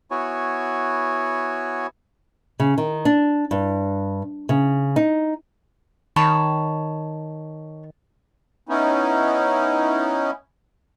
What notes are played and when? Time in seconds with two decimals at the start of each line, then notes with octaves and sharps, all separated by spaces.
0.11 B3 E4 F#4 C#5 G#5
2.60 C#3
2.78 D#3
3.05 D4
3.51 G2
4.49 C#3
4.96 D#4
6.16 D#3 C#5 A5 B5
8.69 B3 C#4 D#4 E4